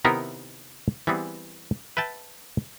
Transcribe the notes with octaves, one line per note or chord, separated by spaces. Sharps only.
C3 D#3 B3 D#4 E4 A#4
E3 G3 B3 C4 G#4
B4 E5 G5 A5